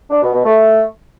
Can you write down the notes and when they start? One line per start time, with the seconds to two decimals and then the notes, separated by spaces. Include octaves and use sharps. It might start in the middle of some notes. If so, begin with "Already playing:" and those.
0.11 D4
0.22 B2
0.33 B2
0.45 A3